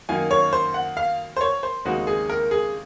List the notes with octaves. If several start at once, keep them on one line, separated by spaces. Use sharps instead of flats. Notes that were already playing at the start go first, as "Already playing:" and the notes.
F#2 D#3 A#3 D#4 G#5
C#5
C5
F#5
F5
C5
C#5
C5
D#2 C#3 G#3 C4 D#4 F#4
G#4
A#4
G#4